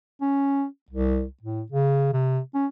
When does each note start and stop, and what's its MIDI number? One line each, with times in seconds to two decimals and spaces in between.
0.22 0.65 61
0.90 1.25 36
1.42 1.62 45
1.72 2.13 49
2.13 2.40 48
2.54 2.67 61